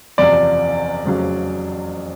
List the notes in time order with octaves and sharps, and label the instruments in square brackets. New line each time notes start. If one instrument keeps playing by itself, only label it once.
[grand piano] F#1 E2 C3 F3 [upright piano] D5
[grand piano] F1 F2 C#3 F#3